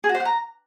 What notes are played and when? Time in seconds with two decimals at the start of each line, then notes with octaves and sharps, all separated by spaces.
0.04 G#4
0.09 F#4
0.15 C5
0.20 F#5
0.25 A#5